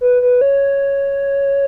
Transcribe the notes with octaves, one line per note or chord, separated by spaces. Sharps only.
B4
B4
C#5